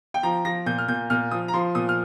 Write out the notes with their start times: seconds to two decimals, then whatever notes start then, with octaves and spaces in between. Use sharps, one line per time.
0.14 G5
0.23 F3 A#5
0.45 F3 A#6
0.66 A#2 G6
0.78 F6
0.88 A#2 G6
1.10 A#2 F6
1.31 F3 D#6
1.48 A#5
1.53 F3 C6
1.75 A#2 D#6
1.89 F6